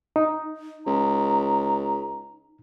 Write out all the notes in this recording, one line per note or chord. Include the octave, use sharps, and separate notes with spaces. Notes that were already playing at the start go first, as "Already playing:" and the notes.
D#4
C#2 A#5